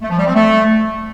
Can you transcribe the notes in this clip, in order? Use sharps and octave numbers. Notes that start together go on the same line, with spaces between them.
A3
F3
G3
C4
A3